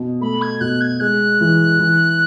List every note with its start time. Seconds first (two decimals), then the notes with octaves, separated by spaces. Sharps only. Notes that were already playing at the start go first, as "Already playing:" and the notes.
Already playing: B2
0.21 A3 B5
0.42 G#6
0.61 B2 F#6
0.81 G#6
1.00 G#3 F#6
1.41 E3
1.79 E3